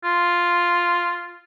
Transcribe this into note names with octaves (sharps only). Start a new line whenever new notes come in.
F4